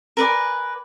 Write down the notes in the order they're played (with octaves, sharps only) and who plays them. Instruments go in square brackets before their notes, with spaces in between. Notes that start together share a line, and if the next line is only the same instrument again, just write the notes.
[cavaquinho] A#4 B4 D5 G#5